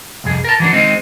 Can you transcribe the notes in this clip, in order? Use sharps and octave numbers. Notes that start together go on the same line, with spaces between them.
C2 F2 G#4
A#4 A5
E3 F#3 D4
D#3 G#3 C4 D#4